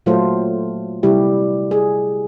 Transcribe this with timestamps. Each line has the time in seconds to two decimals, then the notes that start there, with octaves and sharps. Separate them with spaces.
0.06 A#2 F#3 A3 F4 A4 C5
1.03 C3 G3 E4 G4
1.71 G#4